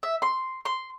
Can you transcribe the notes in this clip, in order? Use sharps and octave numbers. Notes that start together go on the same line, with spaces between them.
E5
C6
C6